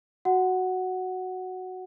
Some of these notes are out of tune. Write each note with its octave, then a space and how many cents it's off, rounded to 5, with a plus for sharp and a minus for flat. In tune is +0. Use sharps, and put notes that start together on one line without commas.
F#4 +0 F#5 +0